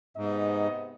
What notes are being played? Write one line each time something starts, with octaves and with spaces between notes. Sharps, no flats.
G#2 C3 B3 D#5